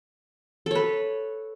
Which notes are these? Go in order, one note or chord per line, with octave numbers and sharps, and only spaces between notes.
A4 B4 C#5